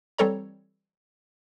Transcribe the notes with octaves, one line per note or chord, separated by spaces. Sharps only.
E3 G3 C4 A4 C#5 A#5